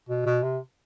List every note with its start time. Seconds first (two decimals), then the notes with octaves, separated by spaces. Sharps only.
0.09 B2
0.26 B2
0.43 C3